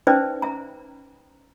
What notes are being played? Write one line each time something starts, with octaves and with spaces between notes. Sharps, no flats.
C#4 D#4 B4 C5 D5 E5
E5 A#5